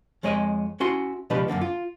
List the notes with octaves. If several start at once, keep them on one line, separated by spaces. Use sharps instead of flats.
F2 G#3 C#5 D#5 G5 G#5
C#4 E4 F#4 A5 C6
C#2 B2 F3 D4 G4 B4
F#2 A#2 D3 A#3
F4